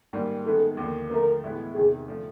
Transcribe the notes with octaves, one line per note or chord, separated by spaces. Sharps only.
G#2 D#3 G3 A#3
F#2 D#3 G#3 B3 A4
D#2 D3 F3 A#3
D3 F3 A3 A#4
A2 E3 G#3 B3 E4
E2 C3 D#3 G#4
D3 F3 A3